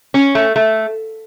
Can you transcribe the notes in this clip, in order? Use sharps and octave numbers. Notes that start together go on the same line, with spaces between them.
C#4
A3
A3